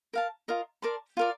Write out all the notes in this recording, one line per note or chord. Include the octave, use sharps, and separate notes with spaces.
A#4 F5 A5
F4 A#4 D#5
A#4 D5 A5 C6
F4 A#4 D5